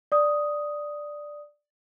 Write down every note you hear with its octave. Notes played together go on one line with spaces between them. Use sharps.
D5 D#6